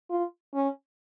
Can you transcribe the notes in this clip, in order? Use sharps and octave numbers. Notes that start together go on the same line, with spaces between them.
F4
C#4